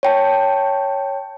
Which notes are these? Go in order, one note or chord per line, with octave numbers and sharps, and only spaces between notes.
C#5 G5 A5